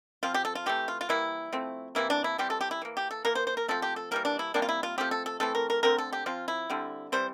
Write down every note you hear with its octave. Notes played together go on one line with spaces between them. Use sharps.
F3 C4 F4
G4
A4
F4
C3 E3 A3 G4
F4
F4
E3 G3 A#3 E4
F3 A3 C4
C3 E3 A#3 E4
D4
E4
E3 G3 C4 G4
A4
G4
E4
E3 A#3
G4
A4
E3 A#3 A#4
C5
C5
A#4
F3 A3 C4 A4
G4
A4
E3 G3 A#3 A#4
D4
E4
C3 G3 A#3 D4
F4
E4
F4
F3 A3 C4 G4
A4
A4
E3 A3 C4 A4
A#4
A#4
D3 A3 C4 A#4
A4
G4
F3 C4 F4
E4
D3 G3 C4
E3 G3 C4 C5